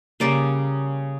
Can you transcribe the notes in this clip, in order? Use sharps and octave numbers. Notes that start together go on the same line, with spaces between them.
C#3 G3 A#3 D5